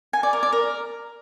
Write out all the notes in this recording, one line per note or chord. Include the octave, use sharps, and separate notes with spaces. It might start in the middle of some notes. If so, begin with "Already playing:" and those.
G#5
D5
A#4
D5
A#4